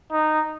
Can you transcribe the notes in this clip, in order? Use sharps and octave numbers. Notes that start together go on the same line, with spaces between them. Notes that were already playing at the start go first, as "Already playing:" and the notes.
D#4